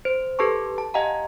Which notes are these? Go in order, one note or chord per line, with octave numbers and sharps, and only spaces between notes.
C5
G4 A4 B4 A5 C#6
A5
G4 D#5 F5 F#5 G#5 A#5